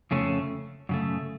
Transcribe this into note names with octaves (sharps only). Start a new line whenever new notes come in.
F2 C#3 A3 C#4
F#2 C#3 A3